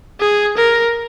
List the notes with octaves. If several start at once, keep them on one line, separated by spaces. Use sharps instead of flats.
G#4
A#4